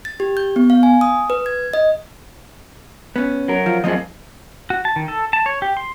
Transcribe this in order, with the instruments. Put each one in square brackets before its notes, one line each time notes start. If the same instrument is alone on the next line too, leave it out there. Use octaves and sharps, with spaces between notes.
[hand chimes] A6
G4
G6
B3
F5
G#5
D#6
B4
G#6
D#5
[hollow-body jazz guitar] B3 C#4
[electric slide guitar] F#3 A#4
[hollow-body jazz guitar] F3
[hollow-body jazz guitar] F#2 A#3 D#5 [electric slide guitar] F3 C4 G#4
[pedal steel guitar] F#4
A5
D#3
A4
A5
C#5
G4
C6